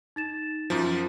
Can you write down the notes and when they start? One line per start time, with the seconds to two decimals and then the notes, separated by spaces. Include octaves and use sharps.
0.16 D#4 A6 E7
0.70 F#2 F3